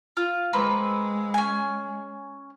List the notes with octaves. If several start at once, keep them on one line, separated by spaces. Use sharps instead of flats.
F4
G#3 A#3 C4 B4
C#4 G#5